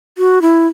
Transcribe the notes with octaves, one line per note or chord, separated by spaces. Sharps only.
F#4
E4